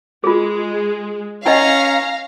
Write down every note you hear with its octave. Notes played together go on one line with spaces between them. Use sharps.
G#3 F4 G#4
C#4 E4 D#5 F5 F#5 A#5